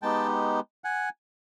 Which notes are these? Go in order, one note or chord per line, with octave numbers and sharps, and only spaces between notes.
G#3 B3 D#4 G4 G5 A5
F#5 G#5